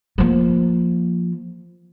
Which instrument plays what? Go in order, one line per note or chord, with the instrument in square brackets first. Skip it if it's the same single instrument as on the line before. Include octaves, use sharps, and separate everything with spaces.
[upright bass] F3 A#3